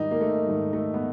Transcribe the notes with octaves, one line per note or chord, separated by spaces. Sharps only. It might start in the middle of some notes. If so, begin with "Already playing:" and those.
Already playing: G#2 D#3 G3 D#4
A#3
A3
G#2 D#3 G3
A3
B3